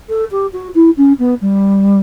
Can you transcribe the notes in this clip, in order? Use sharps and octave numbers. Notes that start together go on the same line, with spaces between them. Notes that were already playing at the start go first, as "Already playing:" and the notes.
A4
G4
F#4
E4
C#4
B3
G3